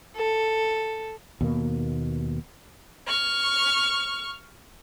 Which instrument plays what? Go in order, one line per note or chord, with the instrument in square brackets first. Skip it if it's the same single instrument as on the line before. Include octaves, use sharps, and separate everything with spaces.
[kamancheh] A4
[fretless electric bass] D#2 B2 A#3
[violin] C#6 F6